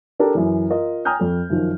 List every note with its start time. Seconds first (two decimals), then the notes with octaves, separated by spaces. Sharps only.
0.19 D4 G4 A4 A#4
0.35 F#2 E3
0.70 F4 A#4 D#5
1.05 G5 G#5 A#5 D#6 F6 G6
1.19 F2 A4
1.50 F#2 D#3 F3